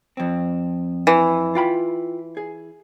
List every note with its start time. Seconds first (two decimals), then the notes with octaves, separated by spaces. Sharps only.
0.17 F2 C4
1.07 E3
1.55 F4 G5 B5
2.37 G#4